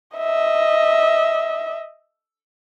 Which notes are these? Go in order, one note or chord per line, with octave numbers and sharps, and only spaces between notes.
D#5 E5